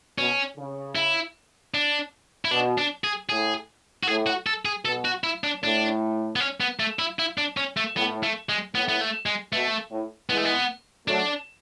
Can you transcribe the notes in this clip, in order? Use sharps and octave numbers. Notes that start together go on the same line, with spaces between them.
B2 C#4
C#3
E4
D4
E4
B2 D4
D4
G#4
A2 G#4
F#4
A2 G#4
F#4
A4
G#4
B2 A4
F#4
E4
D4
A2 D4
B3
C#4
B3
A3
E4
E4
D4
C#4
A3
A2 B3
A3
G#3
A2 B3
B3
A3
G#3
B2 A3
A2
E3 G#3 B3
A3
B3
F#3 A3 D4